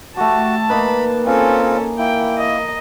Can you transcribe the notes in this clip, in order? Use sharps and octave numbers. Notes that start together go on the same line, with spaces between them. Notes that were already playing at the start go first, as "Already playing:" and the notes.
A3 F#4 G4 A5
A#3 D#4 B4 B5
C4 C#4 F4 A4 G#5
A#3 E4 G5
D#5